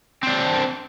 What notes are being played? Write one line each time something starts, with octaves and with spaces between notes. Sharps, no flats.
C4 D4